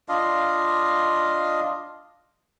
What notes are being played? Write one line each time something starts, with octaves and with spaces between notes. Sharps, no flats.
D4 F4 D#5 F5